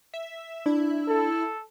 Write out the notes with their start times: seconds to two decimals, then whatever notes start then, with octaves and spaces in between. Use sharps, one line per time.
0.14 E5
0.66 D4 E4
1.09 A4